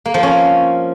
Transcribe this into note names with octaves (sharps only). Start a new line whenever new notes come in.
A#3
F3
C#4